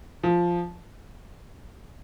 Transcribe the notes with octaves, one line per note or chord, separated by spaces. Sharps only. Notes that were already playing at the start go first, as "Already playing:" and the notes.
F3